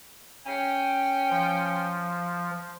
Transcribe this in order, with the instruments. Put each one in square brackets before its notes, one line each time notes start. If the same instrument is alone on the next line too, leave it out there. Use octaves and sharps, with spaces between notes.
[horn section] C#4 G5
[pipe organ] F3